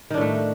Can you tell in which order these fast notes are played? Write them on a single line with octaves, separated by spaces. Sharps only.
D#3 D4 A2 A3